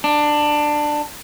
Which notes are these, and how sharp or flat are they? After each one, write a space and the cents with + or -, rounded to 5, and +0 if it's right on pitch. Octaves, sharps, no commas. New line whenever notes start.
D4 +15